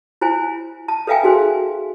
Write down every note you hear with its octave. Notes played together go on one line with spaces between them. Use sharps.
E4 F4 C5 G#5
A5
A4 B4 E5 F5 G5 G#5
D#4 F#4 G#4 C5 G#5